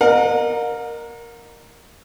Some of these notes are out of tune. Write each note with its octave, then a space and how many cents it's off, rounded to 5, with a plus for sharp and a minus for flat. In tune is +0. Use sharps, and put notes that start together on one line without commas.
A#4 +0 D#5 -30 F#5 -45